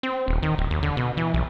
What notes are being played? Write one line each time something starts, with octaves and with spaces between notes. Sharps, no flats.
C4
D#1
D#3
D1
D#2
D3
B2
E3
B1